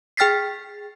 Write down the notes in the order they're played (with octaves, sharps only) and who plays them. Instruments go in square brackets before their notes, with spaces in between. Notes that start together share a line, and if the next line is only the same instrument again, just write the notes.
[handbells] G#4 G5 F6 A6 B6 C7